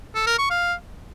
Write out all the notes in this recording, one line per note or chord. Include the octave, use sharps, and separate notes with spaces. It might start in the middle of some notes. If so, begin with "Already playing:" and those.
A4
A#4
C#6
F5